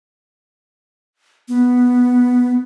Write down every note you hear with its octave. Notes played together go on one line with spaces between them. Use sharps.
B3